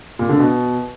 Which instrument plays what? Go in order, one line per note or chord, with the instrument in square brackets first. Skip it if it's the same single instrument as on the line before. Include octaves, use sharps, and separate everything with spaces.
[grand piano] A#2
D3
B2